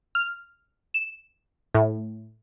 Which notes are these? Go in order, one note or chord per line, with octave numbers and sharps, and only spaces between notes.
F6
E7
A2